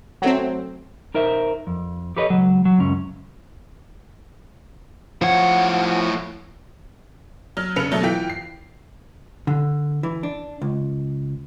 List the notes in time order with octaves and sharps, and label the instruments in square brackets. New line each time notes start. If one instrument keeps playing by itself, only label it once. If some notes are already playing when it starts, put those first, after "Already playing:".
[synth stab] F#3 A3 C4
[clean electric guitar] D#4 A#4 C5 E5
F2
G4 A4 B4 C#5 D#5
C#2 F#3
F#3
C#2 F#2 C#4
[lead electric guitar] A2 F#5 [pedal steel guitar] F3 C#5
[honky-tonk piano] F#3 F6
F1 C#3 B4 C#7 F7
B2 F#3 A3
E3 F4 G5 B6
C7
[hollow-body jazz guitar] D3
E3
D4
C#2